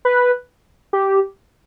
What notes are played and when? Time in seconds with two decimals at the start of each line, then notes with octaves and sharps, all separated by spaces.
0.05 B4
0.93 G4